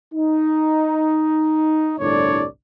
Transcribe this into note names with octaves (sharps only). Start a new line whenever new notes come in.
D#4
G1 C2 A2 D4 C#5 D5